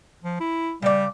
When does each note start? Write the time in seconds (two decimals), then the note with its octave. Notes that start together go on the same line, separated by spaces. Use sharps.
0.24 F3
0.40 E4
0.82 C#3 G3 D5